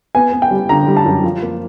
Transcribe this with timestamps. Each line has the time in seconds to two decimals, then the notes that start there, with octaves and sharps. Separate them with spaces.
0.15 B3 G#5
0.33 B3
0.42 G5
0.51 G3
0.69 D3 A#5
0.87 G3
0.97 A5
1.05 F#2
1.24 F3
1.42 A#3